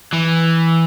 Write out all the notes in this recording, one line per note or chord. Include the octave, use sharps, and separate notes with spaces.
E3